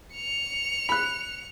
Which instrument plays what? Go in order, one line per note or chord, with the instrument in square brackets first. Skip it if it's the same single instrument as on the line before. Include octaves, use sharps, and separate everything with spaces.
[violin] C#7 F7
[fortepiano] B5 F#6